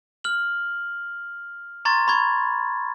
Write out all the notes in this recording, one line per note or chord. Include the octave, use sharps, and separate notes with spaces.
F6 F#7
A#5 C6 C#6 G#6 A6
B5 C#6 G#6